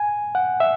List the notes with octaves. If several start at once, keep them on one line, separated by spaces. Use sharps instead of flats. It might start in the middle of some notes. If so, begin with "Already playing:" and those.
Already playing: G#5
F#5
E5